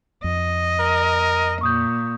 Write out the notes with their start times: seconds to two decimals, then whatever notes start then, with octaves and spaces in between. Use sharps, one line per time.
0.24 F2 D#5
0.80 A#4
1.61 A#2 C#6 D#6 G6